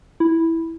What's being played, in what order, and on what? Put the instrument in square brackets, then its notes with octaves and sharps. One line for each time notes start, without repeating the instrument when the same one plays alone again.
[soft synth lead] E4